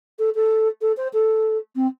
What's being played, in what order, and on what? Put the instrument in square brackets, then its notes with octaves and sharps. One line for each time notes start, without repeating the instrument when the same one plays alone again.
[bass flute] A4
A4
A4
C5
A4
C4